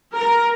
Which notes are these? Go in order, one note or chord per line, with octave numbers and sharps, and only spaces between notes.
A#4